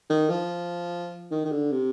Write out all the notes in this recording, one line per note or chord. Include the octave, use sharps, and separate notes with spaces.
D#3
F3
D#3
D#3
D3
C3